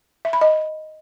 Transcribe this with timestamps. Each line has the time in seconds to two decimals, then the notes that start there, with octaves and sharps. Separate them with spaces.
0.25 E5
0.33 B5
0.41 D#5